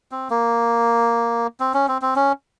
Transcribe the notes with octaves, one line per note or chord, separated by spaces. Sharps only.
C4
A#3
C4
C#4
C4
C4
C#4